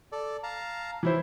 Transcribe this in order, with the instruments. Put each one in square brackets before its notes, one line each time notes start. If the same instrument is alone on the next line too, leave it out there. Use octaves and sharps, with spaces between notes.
[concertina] A4 D5
F5 A5 A#5
[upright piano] E3 E4 C5